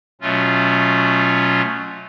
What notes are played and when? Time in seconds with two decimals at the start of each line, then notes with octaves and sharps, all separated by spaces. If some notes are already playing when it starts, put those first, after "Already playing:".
0.21 B2 F#3 A3 C#4 F4